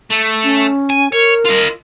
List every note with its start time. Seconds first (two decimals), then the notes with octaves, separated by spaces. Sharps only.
0.10 A3
0.44 C#4
0.90 G#5
1.12 A#4 C#5
1.46 F4 D#5